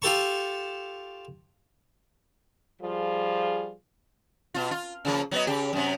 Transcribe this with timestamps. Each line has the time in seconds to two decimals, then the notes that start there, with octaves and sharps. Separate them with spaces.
0.02 F4 G4 A4 A5 C#6
2.82 F3 G3 F4 G#4
4.54 B2 F4
4.71 F4
5.05 C#3 F3 A#3
5.31 F#3 B3 D#5
5.47 C#3 G4
5.73 F#2 C3